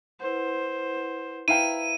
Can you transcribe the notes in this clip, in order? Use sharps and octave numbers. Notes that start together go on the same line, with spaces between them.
E4 B4 C5 F#5
E4 B4 F5 G5 A#5 D#7